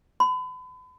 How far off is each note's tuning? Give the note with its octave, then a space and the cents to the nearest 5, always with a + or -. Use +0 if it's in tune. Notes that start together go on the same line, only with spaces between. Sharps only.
B5 +40